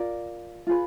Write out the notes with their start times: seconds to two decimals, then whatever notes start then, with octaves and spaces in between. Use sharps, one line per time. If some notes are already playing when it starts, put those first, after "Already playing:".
Already playing: F4 A#4 D5
0.67 F4 G#4 B4